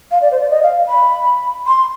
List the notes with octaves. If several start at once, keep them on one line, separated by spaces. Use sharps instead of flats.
F5
D5
C5
D5
D#5
F5
B5
C6